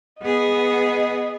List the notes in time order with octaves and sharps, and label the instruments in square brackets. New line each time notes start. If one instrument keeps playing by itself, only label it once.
[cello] B3 G#4 [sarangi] D#5